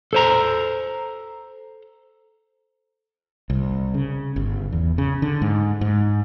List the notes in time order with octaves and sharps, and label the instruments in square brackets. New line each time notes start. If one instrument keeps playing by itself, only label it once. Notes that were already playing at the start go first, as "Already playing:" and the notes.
[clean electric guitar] A4 C5 A#5
[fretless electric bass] C2
C#3
G1
E2
C#3
D3
G#2
G#2